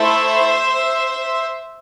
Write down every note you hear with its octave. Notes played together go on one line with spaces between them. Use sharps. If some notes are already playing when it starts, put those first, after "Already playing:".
Already playing: A3 E4 A4 C5 E5